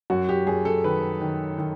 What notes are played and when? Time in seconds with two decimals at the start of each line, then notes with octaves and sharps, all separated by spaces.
0.10 F#2 F#4
0.29 G4
0.47 F#2 G#4
0.65 A4
0.84 D#3 B4
1.21 D#3
1.58 D#3